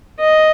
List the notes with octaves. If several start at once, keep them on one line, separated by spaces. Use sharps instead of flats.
D#5